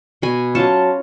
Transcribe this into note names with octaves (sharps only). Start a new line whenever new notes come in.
B2 G#5 B5
F#3 C#4 F4 A5 C#6